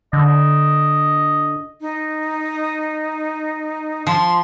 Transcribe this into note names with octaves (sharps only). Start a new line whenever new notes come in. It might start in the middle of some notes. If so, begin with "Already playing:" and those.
D3 D#5
D#4
F3 C6